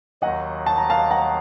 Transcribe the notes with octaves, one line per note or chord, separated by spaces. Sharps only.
D#2 D#3 F#3 D#5 F#5
A5
A#5
F5 A5
F#5 A#5